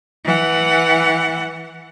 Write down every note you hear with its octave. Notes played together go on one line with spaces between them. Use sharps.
E3 F#5